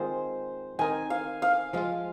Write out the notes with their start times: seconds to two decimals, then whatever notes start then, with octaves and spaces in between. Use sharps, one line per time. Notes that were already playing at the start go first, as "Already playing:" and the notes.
Already playing: D#3 G#3 C4 F4 G#4 C5
0.79 D#3 C4 D#4 A#4 G#5
1.10 F5
1.42 F5
1.73 F3 G#3 F4 F5